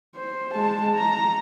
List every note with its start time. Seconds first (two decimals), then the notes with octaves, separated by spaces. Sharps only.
0.16 C5
0.54 G#3 A5
0.95 A#5